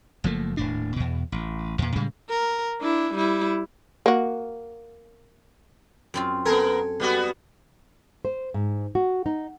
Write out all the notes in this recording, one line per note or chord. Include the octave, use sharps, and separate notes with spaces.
F#1 F3 A3 A#3
D#1 A2 D4
E2 B2
A1
E2 A#2
A2 C#3 G3 G#3
A#4
D4 E4
G3 E4
A#3 F#4
F#2 C4 F4
B3 A4 A#4 G#5
G3 B3 F#4
C5
G#2
F#4
D#4